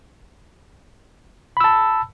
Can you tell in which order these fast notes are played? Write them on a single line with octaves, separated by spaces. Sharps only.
B5 E6 A5